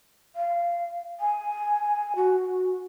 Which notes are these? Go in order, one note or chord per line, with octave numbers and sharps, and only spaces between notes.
F5
G#5
F#4